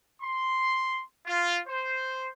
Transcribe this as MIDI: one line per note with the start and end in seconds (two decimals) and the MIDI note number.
0.22 1.02 84
1.26 1.58 65
1.68 2.27 72